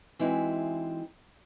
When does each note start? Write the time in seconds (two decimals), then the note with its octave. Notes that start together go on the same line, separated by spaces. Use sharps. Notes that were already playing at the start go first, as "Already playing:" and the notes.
0.19 E3 G#3 C4 D#4 E4 F#4